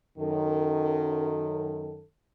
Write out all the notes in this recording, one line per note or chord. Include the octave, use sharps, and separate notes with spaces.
F#2 D#3 A4